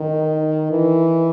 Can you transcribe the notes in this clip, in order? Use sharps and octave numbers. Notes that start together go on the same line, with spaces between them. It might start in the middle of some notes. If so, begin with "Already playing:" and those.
Already playing: D#3
E3